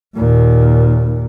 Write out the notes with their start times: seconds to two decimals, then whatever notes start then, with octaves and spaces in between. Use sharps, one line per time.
0.17 D#2 A#2